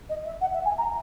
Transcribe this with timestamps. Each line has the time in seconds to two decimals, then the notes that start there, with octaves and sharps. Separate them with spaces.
0.09 D#5
0.25 E5
0.41 F#5
0.53 E5
0.65 G#5
0.78 A#5